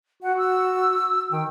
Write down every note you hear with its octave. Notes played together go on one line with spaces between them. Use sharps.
F#4 F#5
E6
D#3 G5